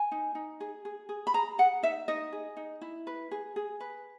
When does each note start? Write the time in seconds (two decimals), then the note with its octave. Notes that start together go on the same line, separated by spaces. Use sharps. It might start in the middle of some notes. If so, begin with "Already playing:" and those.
Already playing: G#5
0.12 D#4
0.35 D#4
0.60 G#4
0.85 G#4
1.09 G#4
1.27 B5
1.34 G#4 A#5
1.58 G#4 F#5
1.83 D#4 E5
2.08 D#4 D#5
2.32 G#4
2.57 D#4
2.81 E4
3.07 B4
3.31 G#4
3.56 G#4
3.80 B4